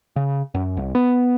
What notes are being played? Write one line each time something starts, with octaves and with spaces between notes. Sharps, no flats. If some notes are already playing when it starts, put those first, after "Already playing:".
C#3
F#2
C2
B3